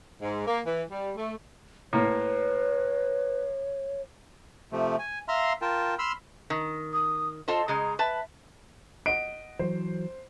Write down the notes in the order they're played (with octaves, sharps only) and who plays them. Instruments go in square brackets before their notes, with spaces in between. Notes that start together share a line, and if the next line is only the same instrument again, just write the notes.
[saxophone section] G#2
A#3
E3
G3
A3
[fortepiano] A2 A#3 [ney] B4 [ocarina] C#5
[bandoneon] C3 F3 A3
G#5
E5 F5 A#5 C6 F6
F4 A#4 G5 A5
B5 C6 E6 F6
[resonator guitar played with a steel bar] D#3
[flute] D#6
[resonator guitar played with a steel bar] F4 A4 C5 [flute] D#5
[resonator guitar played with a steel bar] C#3 G#3 [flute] A#5
[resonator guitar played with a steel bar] B4 A5 [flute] E5
[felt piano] D#5 F#5 [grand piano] D7
[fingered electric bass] E3 F#3 [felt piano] C5